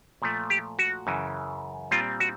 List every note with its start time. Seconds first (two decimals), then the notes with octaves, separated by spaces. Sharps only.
0.22 A#2 F3 A3
0.50 G4
0.79 F#4
1.07 F#2 C#3 E3
1.91 A#2 G3 C4 F4
2.20 F#4